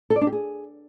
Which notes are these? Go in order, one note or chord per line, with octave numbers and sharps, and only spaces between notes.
A4
D5
D4
G4
G#4